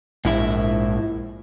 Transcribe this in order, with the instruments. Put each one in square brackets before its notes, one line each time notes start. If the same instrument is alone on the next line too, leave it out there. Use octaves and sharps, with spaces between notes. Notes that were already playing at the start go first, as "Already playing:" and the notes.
[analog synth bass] A#1 [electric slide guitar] G#2 E4 E5